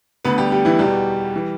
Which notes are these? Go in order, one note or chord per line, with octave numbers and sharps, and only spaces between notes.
D2 D3 B3 B4
G3 G4
G3 G4
E3 E4
E2 B2 G3 G4
E3